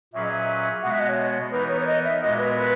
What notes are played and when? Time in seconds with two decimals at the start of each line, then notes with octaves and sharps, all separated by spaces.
0.13 A#2 F#3 C#4 G#4 B4 E5
0.23 D#5
0.32 E5
0.82 B2 G#3 B3 F#4 F#5
0.91 E5
1.00 D#5
1.09 C#5
1.51 E3 B3 D#4 A#4 B4
1.69 C#5
1.81 C#5
1.87 D#5
2.04 E5
2.21 A#2 G#3 B3 F#4 A#4 D#5
2.38 B4
2.55 B4